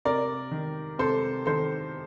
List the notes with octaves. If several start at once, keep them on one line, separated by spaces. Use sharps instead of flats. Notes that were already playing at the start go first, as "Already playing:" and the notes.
C3 A#4 D5
D#3
C3 A4 C5
D#3 A4 C5